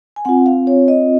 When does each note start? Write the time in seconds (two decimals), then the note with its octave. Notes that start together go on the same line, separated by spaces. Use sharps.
0.16 G#5
0.25 C4 F4 F#5
0.46 F5
0.67 C#5
0.88 D#5